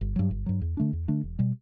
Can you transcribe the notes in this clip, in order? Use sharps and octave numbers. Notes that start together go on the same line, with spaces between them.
G1
G2 F#3
G1
G2 F#3
E2
D3 A3 D4
E2
D3 A3 D4
E1
B2 G3